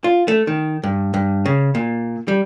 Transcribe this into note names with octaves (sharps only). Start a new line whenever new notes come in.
F4
A3
D#3
G2
G2
C#3
A#2
G3